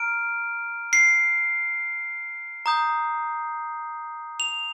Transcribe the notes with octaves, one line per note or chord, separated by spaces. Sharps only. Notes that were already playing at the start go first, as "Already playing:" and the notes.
Already playing: A#5 F6 D7
C7
A#5 D#6 G6
F7